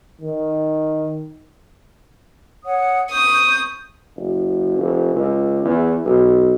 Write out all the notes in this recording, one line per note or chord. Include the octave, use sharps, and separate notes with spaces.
D#3
C#5 F#5 D#6
C#6 D#6 G6
F#1
F1
C#2
E2
B1